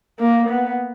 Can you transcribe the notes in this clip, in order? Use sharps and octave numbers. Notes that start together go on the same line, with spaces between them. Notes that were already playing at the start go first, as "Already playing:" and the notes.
A#3
B3